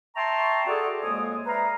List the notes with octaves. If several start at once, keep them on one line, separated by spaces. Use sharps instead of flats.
E5 G5 A5 A#5 C6 C#6
F#4 G#4 A4 D5
F2 G#3 A#3 C#5 G#5 D#6
B4 D5 E5 F5 A#5